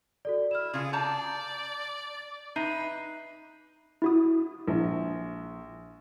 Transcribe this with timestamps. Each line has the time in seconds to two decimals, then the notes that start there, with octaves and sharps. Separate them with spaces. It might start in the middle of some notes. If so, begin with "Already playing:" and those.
0.25 F#4 A4 D5
0.51 E4 F6 E7
0.74 C#3 F4 G#4
0.93 D5 A5 A#5 G6
2.56 D#4 B4 E5 C7 D#7
4.02 E4 F#4 D#6
4.68 A#1